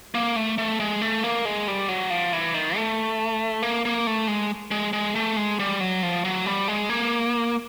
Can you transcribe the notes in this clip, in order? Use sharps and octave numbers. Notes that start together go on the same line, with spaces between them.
A#3
A3
A3
G#3
A3
A#3
G#3
G3
F#3
F3
E3
D#3
A3
A#3
A#3
A3
G#3
G#3
G#3
A3
G#3
G3
F#3
F3
F#3
G3
G#3
A#3